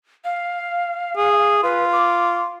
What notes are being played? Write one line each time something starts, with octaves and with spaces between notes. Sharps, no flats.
F5
G#4
F4 B4
D6